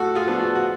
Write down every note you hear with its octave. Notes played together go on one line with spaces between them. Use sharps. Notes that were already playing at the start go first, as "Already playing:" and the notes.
Already playing: A2 F#4 A4
F4 G#4
F3 B3 D4
F#4
F#4